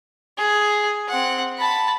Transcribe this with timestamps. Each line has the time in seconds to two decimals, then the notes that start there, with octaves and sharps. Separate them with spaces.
0.38 G#4
1.08 C4 F#5
1.58 A5 B5